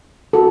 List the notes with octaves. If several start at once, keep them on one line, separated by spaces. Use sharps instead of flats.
F#4 A4